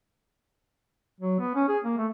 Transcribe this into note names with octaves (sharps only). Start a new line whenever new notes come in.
F#3
B3
C#4
G#4
A#3
A3